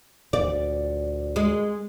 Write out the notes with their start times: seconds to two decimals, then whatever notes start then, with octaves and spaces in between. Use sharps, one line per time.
0.33 D2 A#2 D5
1.36 G#3